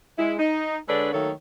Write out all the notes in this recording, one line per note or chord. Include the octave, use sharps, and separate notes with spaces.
G#3 E4
D#4
D3 G#3 D4 A4 B4 C#5
D#3 F#3 A3 A#3 A4 C#5